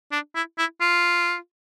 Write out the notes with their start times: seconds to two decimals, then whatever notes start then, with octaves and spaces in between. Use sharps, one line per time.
0.12 D4
0.35 E4
0.58 E4
0.81 F4